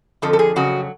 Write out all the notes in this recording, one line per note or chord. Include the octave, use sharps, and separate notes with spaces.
F2 D3 F3 A4
A4
G#4
F2 C#3 F#3 F#4